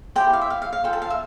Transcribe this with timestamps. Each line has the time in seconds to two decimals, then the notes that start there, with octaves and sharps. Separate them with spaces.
0.16 E4 G4 C5 G5
0.33 F5
0.42 E5
0.50 F5
0.62 F5
0.73 F5
0.84 F4 A4 C5 G5
0.93 A5
1.02 F5
1.10 E5